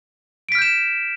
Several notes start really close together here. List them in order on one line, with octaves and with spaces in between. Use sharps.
D7 B6 F6 G6 E7